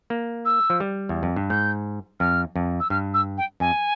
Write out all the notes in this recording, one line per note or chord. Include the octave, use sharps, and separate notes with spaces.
A#3
E6
F3
G3
E2
F2
G2
G#2 G6
F2 F6
F2
E6
G2 F6
E6
G5
F2 G#5